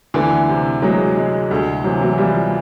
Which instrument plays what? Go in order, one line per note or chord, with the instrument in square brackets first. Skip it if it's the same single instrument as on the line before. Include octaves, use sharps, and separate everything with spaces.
[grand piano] D2 [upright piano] D3 E3
[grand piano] C3
[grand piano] E3 [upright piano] F#3 G#3
[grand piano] G#3
[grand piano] D2 [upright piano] G3 A3
[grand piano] C3 [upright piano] E3 F#3
[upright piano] E3 F#3
[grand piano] E3 [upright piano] F3 G3